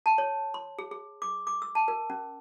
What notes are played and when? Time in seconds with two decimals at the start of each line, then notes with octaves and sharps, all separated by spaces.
0.06 A5
0.18 C#5
0.54 C6
0.79 G#4
0.91 G#4
1.22 D6
1.47 D6
1.62 E6
1.75 A5
1.88 A#4
2.10 C#4